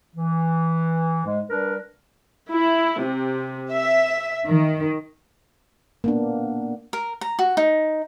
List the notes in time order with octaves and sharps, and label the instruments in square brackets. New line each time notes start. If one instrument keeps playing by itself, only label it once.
[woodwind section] E3
G#2 G#3
G3 D4 A#4 B4
[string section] E4
C3
E5
D#3
[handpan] A#3 B3 D4
[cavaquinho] A#4
A#5
F#4
D#4